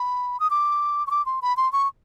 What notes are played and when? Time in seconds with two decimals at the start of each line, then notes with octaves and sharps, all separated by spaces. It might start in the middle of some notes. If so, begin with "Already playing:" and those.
Already playing: B5
0.40 D#6
0.51 D6
1.07 C#6
1.11 D6
1.26 C6
1.42 B5
1.57 C6
1.73 C#6